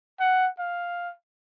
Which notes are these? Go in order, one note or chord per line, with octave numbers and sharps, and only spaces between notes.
F#5
F5